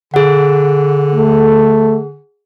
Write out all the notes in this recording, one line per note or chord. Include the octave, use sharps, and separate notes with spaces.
D3 G#4 F#5
A3